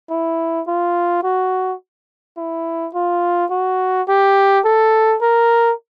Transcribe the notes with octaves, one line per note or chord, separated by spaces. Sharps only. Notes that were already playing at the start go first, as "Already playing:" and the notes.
E4
F4
F#4
E4
F4
F#4
G4
A4
A#4